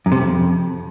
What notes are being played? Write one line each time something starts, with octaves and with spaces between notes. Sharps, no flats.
F#2
C3
F2